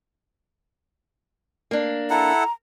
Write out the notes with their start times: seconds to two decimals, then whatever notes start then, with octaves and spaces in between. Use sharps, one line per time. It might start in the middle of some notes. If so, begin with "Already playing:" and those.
1.71 A#3 D4
2.10 E4 A4 F#5 A#5